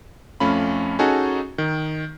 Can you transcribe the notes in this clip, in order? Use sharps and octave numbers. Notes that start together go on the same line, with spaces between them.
F2 A3 C#4 F4 B5
C#4 D#4 F#4 G#4 A4
D#3